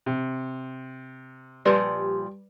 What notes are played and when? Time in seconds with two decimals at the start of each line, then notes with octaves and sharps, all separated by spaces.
0.06 C3
1.65 A#2 F3 G3 B4 D5